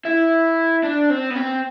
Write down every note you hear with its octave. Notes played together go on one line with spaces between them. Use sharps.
E4
D4
C4
B3
C4